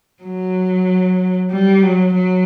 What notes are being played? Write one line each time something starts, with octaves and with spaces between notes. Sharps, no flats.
F#3
G3
F#3
F#3